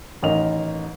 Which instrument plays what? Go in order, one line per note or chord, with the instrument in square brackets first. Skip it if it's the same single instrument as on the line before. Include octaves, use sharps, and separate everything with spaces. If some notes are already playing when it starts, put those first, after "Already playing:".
[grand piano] A1 D#3 A#4 D#5 F7